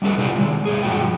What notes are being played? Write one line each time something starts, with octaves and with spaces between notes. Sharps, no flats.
G3 C#4 G4 A4 B4
C3 E4 F4 G4 D5
D#3 G#3
B2 A3 G#4
G2 F3 F#3 F#4 G4 G5